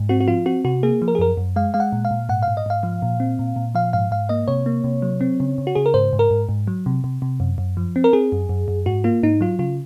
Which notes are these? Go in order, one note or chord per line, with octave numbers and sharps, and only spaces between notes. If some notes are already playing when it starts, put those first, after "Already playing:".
Already playing: G#2
C4 F#4
F#4
F3 F4
C4 F#4
C3 F#4
A#3 G#4
F3
A#4
G#4
F#2 A#4
F#2
G#3 F5
G#3 F5
F#5
A#2
F5
A#2
G#2 F#5
F5
G#2
D#5
G#2 F5
F3
A#2
C4
A#2
A#2
F3 F5
G#2 F5
G#2 F5
A#3 D#5
C3 C#5
A#3
C3
F#3
C4
C#3
C#3
F#4
C#3 G#4
A#4
G#2 C5
G#2
A#4
G#2
G#2
F#3
C3
C3
C3
F#2
F#2
F3
C4
A#4
C4 G#4
F#2
F#2
F#2
G#2 F#4
A#3 F4
G#2 D#4
F#3 F4
C#3 F4